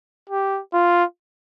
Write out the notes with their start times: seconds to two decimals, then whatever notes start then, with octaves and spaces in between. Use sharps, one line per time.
0.30 G4
0.73 F4